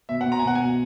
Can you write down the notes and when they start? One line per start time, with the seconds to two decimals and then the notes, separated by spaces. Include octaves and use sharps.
0.09 B2 E5
0.21 F#5
0.26 B2
0.32 A#5
0.39 G#5
0.44 B2 F#5
0.55 B2 G#5